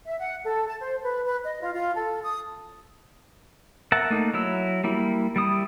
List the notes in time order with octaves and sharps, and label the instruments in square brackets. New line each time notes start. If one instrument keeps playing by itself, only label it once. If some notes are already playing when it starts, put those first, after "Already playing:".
[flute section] E5
F#5
A4
A5
C5
B4
B4
D#5
F4
F4
A4
D#6
[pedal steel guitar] A#4 E5 F#5 A5
A3 A#3 D#4
F#3 E4 E6
G3 A#3 E4
G3 E4 D#6